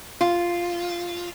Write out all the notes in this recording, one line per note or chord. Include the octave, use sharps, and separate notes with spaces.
F4